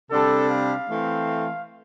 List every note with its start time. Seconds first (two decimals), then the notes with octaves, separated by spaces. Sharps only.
0.11 C3 G3 D4 A4
0.50 F5
0.89 E3 A3 C4